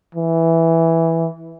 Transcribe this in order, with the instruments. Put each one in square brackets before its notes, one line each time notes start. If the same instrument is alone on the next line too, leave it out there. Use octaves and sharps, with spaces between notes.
[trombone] E3